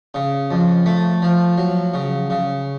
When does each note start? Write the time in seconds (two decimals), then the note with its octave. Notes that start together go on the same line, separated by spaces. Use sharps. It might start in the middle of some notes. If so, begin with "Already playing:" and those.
0.14 C#3
0.51 F2
0.86 A3
1.22 F3
1.58 F#3
1.94 C#3
2.30 C#3